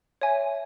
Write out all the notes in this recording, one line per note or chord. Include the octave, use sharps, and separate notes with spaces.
C#5 E5 G#5